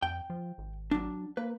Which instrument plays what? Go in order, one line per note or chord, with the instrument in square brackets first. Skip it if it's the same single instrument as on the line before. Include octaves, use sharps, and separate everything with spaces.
[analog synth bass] F2 [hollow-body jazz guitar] G5
[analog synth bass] F3
G#1
[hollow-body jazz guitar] F#3 D4
[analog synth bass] A#3 [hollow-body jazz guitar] B4